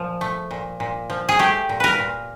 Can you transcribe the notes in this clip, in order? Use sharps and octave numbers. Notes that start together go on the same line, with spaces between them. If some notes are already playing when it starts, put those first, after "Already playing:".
Already playing: A#2 F3
A3
A#2
A#2
F3
G#4
A3 G4
A#2
A#4 B4
A#2